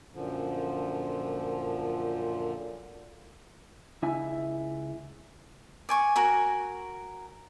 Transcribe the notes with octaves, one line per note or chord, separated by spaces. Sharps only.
F#2 A#2 D3 F3
C#2 E4 E5 G#5
D5 G#5 C#6
F#4 A#4 G#5